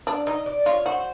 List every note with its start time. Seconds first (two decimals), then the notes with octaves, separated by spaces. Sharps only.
0.07 D4 D5
0.27 D#4 D#5
0.46 D5
0.66 F4 C#5
0.85 F#4 C5